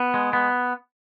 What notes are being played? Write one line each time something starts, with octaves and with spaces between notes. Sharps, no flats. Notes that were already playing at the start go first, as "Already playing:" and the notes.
Already playing: B3
G#3
B3